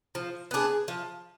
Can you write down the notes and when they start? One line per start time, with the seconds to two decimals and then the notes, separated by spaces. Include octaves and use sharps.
0.15 F3
0.51 B3 D4 G#4
0.88 F3